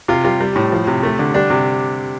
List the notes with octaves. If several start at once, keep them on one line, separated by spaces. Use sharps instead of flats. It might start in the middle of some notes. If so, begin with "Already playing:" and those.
C3 F4
G3 F4
G3
A2
F3
C3
A3
D3
G3 D4
C3